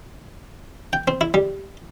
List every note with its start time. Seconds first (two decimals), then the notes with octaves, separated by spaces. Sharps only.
0.93 G5
1.08 C4
1.21 E4
1.34 G3